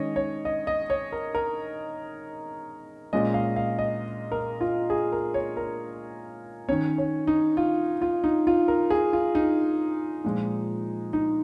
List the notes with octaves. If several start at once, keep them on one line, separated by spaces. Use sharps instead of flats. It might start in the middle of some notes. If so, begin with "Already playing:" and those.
Already playing: D#3 G#3 C#4 C#5 D#5
C#5
D#5
D#5
C#5
A#4
A#4
A#2 G#3 C#4 D#5
F5
F5
D#5
A#4
F4
G#4
A#4
C#5
A#4
D#3 C#4 C#5
C#5
D#4
F4
F4
D#4
F4
A#4
G#4
F4
D#4
A#2 F3 G#3
D#4